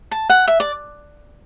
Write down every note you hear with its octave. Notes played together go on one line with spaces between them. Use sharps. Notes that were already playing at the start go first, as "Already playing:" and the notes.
A5
F#5
E5
D5